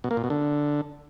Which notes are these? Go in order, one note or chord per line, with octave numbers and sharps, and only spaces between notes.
B2
A#3
A#2
B2
D3